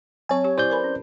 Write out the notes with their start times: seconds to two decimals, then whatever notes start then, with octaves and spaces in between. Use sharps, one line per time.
0.29 F#3 C4 C#5 G#5
0.44 G4 C#6
0.58 E4 G4 C5 D5 C6 G6
0.70 A#4 B4 B5
0.84 C#4